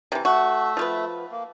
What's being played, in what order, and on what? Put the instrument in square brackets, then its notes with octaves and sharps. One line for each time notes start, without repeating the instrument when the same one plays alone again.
[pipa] C3 E3
[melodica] A3 E5 [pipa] F#4
[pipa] F3 F4 B4
[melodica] A#3